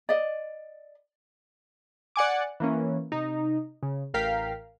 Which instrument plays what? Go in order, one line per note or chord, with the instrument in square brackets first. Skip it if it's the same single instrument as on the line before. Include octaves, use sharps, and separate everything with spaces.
[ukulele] D5 D#5
[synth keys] D5 F#5 G#5 D6
E3 A#3 C#4
C3 D#4
C#3
A1 A#4 F5 G5 B6